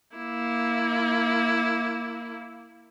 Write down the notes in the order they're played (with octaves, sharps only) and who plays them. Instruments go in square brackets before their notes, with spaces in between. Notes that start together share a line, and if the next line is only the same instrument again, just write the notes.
[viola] A#3 E4